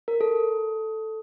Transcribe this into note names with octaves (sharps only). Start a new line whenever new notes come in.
A#4
A4